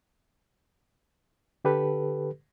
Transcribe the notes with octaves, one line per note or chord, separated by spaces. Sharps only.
D3 G4 A4 B4